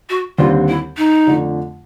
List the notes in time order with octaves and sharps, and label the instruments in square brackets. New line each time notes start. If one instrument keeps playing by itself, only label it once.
[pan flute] F#4
[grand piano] D#2 D3 G3 C4 [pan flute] F4
[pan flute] E4
D#4
[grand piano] F2 D3 F3 A3